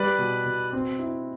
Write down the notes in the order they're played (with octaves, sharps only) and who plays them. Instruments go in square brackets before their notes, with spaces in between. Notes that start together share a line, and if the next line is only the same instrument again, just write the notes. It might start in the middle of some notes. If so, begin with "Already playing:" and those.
Already playing: [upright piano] G3 [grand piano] B4 D5
[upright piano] B2
B2
C4
E4